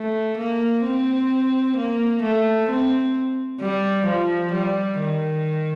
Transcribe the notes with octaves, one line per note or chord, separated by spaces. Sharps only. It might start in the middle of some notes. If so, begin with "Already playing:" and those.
Already playing: A3
A#3
C4
A#3
A3
C4
G3
F3
G3
D#3